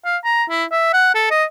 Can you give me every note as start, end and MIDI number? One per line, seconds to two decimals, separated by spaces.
0.05 0.17 77
0.24 0.44 82
0.49 0.65 64
0.71 0.92 76
0.93 1.13 78
1.15 1.26 69
1.30 1.45 75